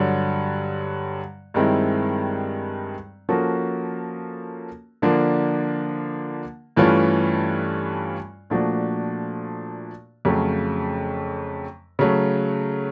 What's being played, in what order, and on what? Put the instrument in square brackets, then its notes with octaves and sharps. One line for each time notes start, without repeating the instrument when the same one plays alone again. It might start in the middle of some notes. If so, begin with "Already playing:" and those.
Already playing: [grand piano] G2 D3 F#3
G2 D#3 G#3 C4 E4
F3 A#3 C#4 F#4 A4
D3 F3 A#3 D4
G2 E3 A3 C#4 F4
A#2 F3 A3 D4 F#4
F2 C#3 F#3 A3
C#3 F#3 A3